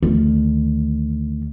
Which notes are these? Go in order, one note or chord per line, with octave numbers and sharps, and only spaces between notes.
D2 D#3